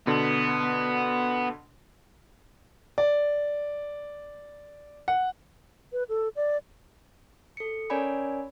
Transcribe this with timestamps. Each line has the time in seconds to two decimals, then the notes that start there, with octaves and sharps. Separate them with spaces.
0.07 B2 D3 B3
2.98 D5
5.08 F#5
5.93 B4
6.09 A4
6.36 D5
7.57 A4 C#7
7.90 C#4 A#4 C#5 D5 G#5 B5